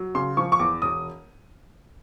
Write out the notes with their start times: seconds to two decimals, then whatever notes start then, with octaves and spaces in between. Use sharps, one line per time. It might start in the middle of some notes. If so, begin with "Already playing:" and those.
Already playing: F#3
0.15 C#3 C6
0.37 F3 C#6
0.52 C#6
0.59 E2 D6
0.82 E1 D#6